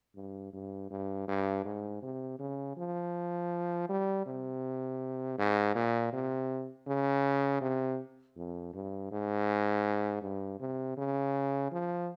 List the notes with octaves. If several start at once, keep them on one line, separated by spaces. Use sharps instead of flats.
G2
G2
G2
G2
G#2
C3
C#3
F3
G3
C3
G#2
A#2
C3
C#3
C3
F2
G2
G#2
G2
C3
C#3
F3